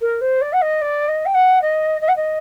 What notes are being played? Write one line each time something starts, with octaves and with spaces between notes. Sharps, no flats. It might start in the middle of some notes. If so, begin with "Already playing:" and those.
A#4
C5
D5
F#5
D#5
D5
D#5
G5
F#5
D#5
D#5
F#5
D#5